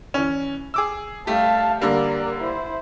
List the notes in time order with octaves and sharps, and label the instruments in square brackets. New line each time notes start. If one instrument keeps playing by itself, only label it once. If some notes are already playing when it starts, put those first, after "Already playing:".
[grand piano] E3 C#4
G#4 D6 E6
[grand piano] G3 A3 G4 [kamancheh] F5 A5
[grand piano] D3 G3 A#3 [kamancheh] A#4 D5
[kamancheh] E4 C5